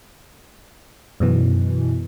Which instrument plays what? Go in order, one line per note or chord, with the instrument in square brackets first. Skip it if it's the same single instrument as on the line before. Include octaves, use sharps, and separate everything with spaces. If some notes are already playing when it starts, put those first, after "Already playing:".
[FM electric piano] F#2 B2 E3